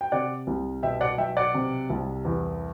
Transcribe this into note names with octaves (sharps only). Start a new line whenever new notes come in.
G5
C3 D5 F#5
C2
B2 E5 G5
D5 F#5
B1 E5 G5
D5 F#5
C3
C2
E2